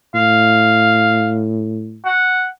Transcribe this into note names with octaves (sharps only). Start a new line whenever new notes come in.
A2 F5
F#5